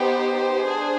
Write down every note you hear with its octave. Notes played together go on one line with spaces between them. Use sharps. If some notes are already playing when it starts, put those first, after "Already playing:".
Already playing: B3 D#4 G4 C5
D4 G#4